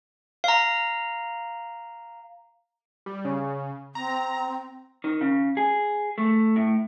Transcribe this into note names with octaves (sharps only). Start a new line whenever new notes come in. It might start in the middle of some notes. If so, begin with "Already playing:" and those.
F5 A#5
G3
C#3
C4 A#5
D#3
C#3
G#4
A3
A2